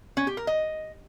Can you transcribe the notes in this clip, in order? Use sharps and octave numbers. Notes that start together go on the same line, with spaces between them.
C#4
G4
A#4
D#5